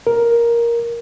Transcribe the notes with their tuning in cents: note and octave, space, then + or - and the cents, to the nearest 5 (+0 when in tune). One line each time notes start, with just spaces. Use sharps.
A#4 +5